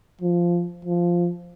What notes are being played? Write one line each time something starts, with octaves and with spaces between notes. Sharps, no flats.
F3
F3